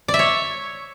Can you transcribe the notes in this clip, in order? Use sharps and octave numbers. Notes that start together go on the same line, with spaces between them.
D5
E5
C#5